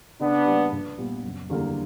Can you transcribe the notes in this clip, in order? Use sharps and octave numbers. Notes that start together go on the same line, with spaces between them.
C#3 B3 D4
G3 A#3
A#1
A#2 G3 B3
F#1
E2 D3 G3 A#3